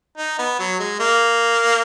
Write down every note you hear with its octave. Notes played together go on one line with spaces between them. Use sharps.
D#4
B3
F#3
G#3
A#3